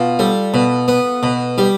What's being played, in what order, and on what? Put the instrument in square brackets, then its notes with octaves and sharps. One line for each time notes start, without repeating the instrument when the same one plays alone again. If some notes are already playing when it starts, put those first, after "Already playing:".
Already playing: [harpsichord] B2 [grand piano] F4
[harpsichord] G3 [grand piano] A4
[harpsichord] B2 [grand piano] B4
[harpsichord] B3
[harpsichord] B2 [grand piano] B4
[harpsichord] G3 [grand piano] G4